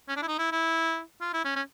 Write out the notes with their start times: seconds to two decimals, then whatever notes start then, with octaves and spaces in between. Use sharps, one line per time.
0.09 C#4
0.17 D4
0.22 E4
0.28 D#4
0.39 E4
0.52 E4
1.21 F4
1.34 E4
1.45 C#4
1.56 C#4